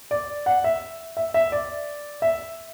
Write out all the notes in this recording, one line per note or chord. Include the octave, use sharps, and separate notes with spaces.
D5
F#5
E5
E5
E5
D5
E5